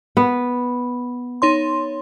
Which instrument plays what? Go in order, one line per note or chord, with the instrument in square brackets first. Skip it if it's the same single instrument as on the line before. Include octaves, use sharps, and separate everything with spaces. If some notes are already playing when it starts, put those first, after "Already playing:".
[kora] B3
[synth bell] D#4 C#5 C6